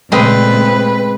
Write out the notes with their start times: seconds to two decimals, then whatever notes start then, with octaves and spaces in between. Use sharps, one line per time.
0.12 A#2 C#3 G#3 A3 C4 B4